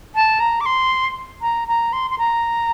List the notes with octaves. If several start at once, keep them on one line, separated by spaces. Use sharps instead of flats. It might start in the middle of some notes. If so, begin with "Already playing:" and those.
A5
A#5
D6
C6
A#5
A#5
C6
C6
A#5